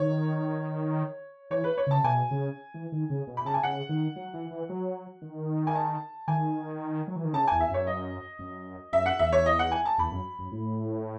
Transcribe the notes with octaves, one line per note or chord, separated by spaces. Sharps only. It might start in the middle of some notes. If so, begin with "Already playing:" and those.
Already playing: D#3 C#5
E3 C#5
B4
C#5
C#3 A5
B2 G#5
C#3
E3
D#3
C#3
B2
B5
C#3 A5
G#5
C#3 F#5
D#3
F#3
E3
E3
F#3
D#3
G#5
A5
D#3 G#5
F#3
E3
D#3
C#3 A5
E2 G#5
E5
F#2 C#5
D#5
F#2
F#2 E5
F#5
E2 E5
C#5
D#5
F#5
G#5
A5
E2 B5
F#2
F#2
A2